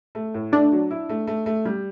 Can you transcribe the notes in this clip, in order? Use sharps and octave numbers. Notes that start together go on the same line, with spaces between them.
A3
A2
A3 D4
F#3
E4
A3
A3
A3
G3